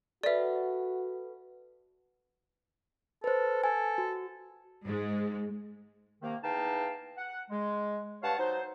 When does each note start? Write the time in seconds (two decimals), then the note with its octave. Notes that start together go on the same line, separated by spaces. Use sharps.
0.23 F#4 A4 B4 D5 E5
3.24 A4 B4 C5
3.64 A4 G#5
3.98 F#4
4.83 G#2 G#3
6.22 C3 D#3 A#3
6.43 E2 D#4 F5 G5 A5
7.17 F#5
7.51 G#3
8.22 G2 C#5 F5 F#5 A5
8.39 F#3 D#4 C5